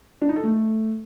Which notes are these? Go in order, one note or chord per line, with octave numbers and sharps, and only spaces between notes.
D4
D#4
A4
A3